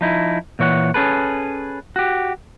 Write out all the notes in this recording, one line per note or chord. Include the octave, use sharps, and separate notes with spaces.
F3 D#4 E4
A#2 E3 C#5 F#5
C#4 G#4 A4 B4
F#4 G4